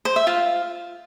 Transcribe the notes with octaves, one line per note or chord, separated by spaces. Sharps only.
C5
E5
F4